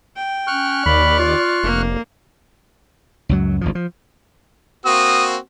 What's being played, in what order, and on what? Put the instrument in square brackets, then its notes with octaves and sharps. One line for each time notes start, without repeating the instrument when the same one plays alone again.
[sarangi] G5
[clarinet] C#4 [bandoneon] C#6 F6 F#6
[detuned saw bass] D#2 [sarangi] D5 [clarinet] B5
[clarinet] F4
[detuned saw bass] F1 [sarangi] A#3
[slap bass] C#2 F#2 F#3
G#1 D2 F3
F3
[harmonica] A#3 C4 F#4 [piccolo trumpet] D#6